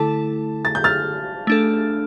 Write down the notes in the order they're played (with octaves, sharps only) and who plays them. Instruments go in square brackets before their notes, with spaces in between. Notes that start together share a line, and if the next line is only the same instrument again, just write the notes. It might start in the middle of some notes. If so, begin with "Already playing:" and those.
Already playing: [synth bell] D3 A3 E4 A4 [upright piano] A5
[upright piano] A6
G6
F6 A6
[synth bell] A3 D4 A4